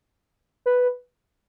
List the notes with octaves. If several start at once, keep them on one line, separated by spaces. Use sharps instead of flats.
B4